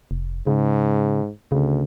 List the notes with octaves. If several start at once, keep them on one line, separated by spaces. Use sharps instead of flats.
F1
G#2 C#3
D2 C#3